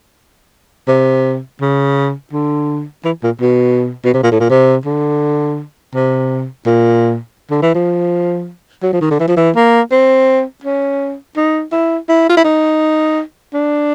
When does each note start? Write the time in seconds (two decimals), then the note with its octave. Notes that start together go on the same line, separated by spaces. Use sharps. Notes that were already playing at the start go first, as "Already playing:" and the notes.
0.88 C3
1.61 C#3
2.33 D3
3.05 E3
3.24 A#2
3.41 B2
4.05 B2
4.14 C3
4.23 A#2
4.32 A2
4.40 A#2
4.50 C3
4.86 D3
5.95 C3
6.66 A#2
7.51 D3
7.63 E3
7.75 F3
8.83 F#3
8.93 F3
9.01 D#3
9.11 D3
9.20 E3
9.28 F3
9.37 E3
9.56 A#3
9.92 C4
10.64 C#4
11.37 D#4
11.72 E4
12.09 E4
12.29 F4
12.37 E4
12.45 D#4
13.54 D4